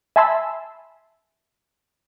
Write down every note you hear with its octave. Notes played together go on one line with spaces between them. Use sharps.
E5 G#5 A5 B5 C6 E6